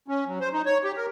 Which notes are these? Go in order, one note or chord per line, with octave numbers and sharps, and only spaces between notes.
C#4
F#3
C5
D#4
C#5
G4
A#4